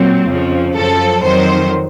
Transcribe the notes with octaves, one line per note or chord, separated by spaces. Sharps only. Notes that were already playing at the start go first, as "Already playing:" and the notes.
Already playing: A#2 F#3 C4
F2 C#3 F3
F#2 F3 A4
F2 D#3 F#3 C5